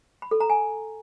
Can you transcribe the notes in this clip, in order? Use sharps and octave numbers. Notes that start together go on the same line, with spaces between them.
B5
A4
A#5
G#5